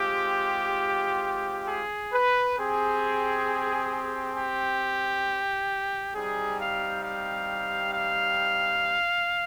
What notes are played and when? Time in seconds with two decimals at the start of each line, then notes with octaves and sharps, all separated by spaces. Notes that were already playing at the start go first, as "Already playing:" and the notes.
Already playing: G#3 C4 F4 G4
1.68 G#4
2.13 B4
2.58 C4 G4 G#4
4.36 G4
6.14 G3 C4 D#4 G4 G#4
6.58 F5
7.03 F5
7.93 F5